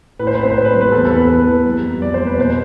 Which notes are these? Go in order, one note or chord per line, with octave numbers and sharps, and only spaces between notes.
A2 B4
C5
B4
C4 C5
B4
C4 C5
B4
G3
B4
E2 A4
A4
E2
B4
E2 B4
E2
G3
F2
G3 D5
G3 C5
B4
B2 C5